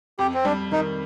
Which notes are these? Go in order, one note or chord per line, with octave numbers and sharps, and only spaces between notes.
F2 G4
C4
G3 D4
D#3 D#4